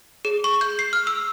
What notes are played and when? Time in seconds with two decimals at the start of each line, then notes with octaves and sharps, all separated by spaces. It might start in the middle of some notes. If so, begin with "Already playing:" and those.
0.25 G#4
0.44 C#6
0.61 G6
0.79 C7
0.93 F6
1.07 E6